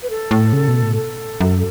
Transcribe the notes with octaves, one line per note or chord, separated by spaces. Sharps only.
B4
A4
A2
C#3
B2
A2
A4
F#2